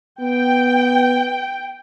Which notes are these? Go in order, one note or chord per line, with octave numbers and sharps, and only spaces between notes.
B3 G5